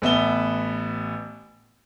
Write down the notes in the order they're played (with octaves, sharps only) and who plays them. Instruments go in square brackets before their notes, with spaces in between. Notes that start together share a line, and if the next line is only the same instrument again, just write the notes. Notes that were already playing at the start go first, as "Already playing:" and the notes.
[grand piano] A1 B3 E5 G7